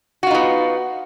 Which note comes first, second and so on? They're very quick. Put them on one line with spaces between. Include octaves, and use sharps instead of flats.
F#4 F4 D#4 B3